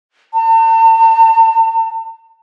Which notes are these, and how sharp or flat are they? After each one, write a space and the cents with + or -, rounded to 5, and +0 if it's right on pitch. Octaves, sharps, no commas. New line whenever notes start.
A5 +45